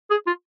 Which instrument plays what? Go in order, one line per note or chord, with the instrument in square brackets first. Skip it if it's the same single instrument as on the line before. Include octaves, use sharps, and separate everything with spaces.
[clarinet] G#4
F4